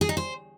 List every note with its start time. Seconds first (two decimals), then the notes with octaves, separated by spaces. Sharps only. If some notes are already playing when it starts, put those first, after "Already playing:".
0.01 G#4
0.09 D#4
0.17 C5